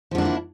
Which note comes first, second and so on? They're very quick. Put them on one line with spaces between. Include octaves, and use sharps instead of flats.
F3 D3 D4 A#3 E4